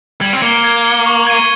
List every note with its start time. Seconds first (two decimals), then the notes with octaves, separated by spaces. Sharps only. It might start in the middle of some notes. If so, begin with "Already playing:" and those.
0.21 G3 G#6
0.33 C4
0.42 A#3 C#7 G7
0.64 G#6
0.85 C#7 G7
1.06 C#6
1.27 G#6 D#7